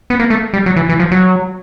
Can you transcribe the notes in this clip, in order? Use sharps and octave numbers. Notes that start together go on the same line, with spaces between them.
B3
A#3
A3
G3
F#3
E3
E3
F3
F#3